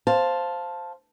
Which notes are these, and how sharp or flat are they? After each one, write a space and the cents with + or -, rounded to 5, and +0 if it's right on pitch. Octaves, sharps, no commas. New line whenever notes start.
C5 +0 F5 +0 A5 +0